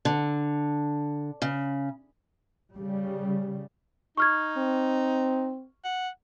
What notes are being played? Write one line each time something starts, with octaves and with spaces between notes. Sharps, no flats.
D3
C#3
C#3 G3
D#4 C#6 F6 G#6
C4
F#5